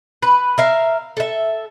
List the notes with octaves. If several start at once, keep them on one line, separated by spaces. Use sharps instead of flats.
B4
A#4 E5 F5
A4 E5